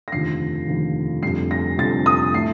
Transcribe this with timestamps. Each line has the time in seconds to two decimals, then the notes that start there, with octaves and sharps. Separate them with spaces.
0.08 A#6
0.12 F1 D#2 D3 F3 C7
0.68 F1 D#2 D3 F3
1.23 F1 F2 D3 G3 C7
1.51 A#6
1.78 F1 F2 D3 G3 A6
2.06 D#6
2.34 A2 A3 C7